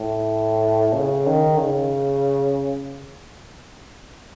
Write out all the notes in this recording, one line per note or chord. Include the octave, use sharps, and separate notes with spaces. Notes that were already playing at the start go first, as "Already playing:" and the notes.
Already playing: A2
C#3
D#3
C#3